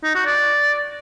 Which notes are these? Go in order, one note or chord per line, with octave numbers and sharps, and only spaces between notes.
D#4
F#4
D5